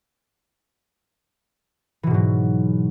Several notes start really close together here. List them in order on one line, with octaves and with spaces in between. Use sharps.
E3 B2 G#2 F#3